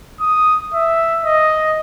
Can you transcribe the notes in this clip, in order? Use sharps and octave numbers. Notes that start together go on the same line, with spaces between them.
D#6
E5
D#5